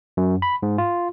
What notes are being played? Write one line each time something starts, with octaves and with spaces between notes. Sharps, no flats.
F#2
B5
G#2
F4